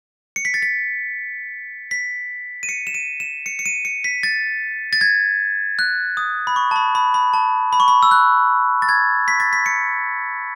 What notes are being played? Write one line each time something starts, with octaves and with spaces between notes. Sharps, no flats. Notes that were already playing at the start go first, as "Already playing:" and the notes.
C#7
B6
A6
B6
B6
D#7
C#7
E7
D#7
E7
C#7
C#7
D#7
C#7
B6
A6
A6
G#6
F#6
D#6
B5
C#6
A5
B5
B5
B5
A5
B5
C#6
B5
E6
F#6
A6
G#6
B6
A6
B6
C#7